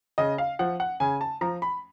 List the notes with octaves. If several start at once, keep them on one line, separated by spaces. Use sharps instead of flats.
C#3 D#5
F5
F3 F#5
F#5
C#3 G#5
A5
F3 A#5
B5